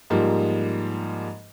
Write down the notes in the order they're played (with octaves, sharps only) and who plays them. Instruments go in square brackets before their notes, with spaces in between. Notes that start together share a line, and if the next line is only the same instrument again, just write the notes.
[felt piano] G#2 F3 G3 A#3